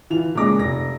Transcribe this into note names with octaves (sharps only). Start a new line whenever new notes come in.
E3 F4 F7
A#2 C#3 G#3 D6 A#6
F1 A#6